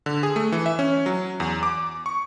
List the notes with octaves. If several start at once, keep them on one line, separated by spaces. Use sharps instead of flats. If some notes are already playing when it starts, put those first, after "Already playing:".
D3
G#4
A3
E3
E5
C#4
F#3
E2
D6
C#6